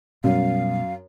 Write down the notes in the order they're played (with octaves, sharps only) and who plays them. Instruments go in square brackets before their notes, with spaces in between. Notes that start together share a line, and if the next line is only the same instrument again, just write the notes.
[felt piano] F#2 [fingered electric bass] B2 G3 B3 [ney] F5